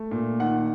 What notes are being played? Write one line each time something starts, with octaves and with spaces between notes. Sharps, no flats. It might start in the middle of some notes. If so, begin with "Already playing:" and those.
Already playing: A3
A#2
D#3 F#5